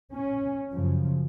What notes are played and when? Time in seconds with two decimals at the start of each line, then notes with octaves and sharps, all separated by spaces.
0.13 C#4
0.72 F#2 C#3 F3